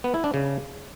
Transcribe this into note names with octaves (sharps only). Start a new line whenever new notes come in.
B3
E4
D4
C#3